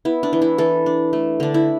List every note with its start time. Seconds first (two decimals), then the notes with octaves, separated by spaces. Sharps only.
0.05 B3 E4
0.23 D4
0.33 E3
0.42 E4
0.58 E3 A4
0.86 D4
1.13 A3
1.40 D3 D4
1.54 E4